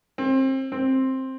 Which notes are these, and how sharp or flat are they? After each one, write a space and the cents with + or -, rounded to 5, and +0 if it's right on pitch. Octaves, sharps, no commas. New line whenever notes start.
C4 +30
C4 +10